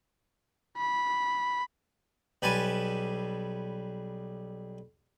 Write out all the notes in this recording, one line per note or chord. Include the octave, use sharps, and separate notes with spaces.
B5
B1 G3 B4 G#5 A5